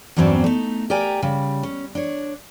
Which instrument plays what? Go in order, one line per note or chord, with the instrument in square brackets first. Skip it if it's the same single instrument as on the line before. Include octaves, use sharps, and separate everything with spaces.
[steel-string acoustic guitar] E2 G2 F#3 C4 C#4 D5
A3 D#4
G4 A#4 D5 G5 G#5 A#5
C#3 G3
C#4
D4 C#5